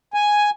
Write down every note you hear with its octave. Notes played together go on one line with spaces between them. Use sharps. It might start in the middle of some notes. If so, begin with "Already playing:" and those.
G#5